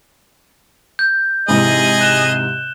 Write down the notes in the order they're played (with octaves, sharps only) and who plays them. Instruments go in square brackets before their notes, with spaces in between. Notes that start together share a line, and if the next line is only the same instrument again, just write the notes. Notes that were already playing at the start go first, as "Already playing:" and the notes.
[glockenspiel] G6
[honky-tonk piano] G#2 C3 E3 [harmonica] G#4 D#5
[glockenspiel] F#6 E7 G7